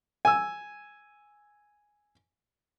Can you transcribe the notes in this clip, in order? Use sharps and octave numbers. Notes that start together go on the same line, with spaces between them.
G#5 E6